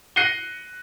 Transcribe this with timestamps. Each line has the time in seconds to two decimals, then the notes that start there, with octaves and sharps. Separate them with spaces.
0.16 F#6 A#6 C7 C#7 D#7 G7